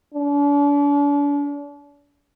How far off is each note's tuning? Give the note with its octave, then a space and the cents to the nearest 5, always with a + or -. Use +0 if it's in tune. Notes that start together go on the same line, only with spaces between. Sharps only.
D4 -40